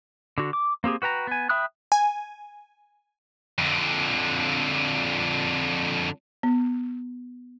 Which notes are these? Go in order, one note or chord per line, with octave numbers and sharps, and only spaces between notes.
D3 F#4
D6
A#3 C4 G4 G#4
F#4 B4 G5 A#5
B3 G#5
E5 G5 B5 D#6 F#6
G#5
F2 D3
B3